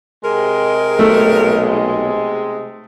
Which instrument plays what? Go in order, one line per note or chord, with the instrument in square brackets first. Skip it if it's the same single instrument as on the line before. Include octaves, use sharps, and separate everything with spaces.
[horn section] C3 G#3 [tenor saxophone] A#4
[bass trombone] B1 [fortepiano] A3 A4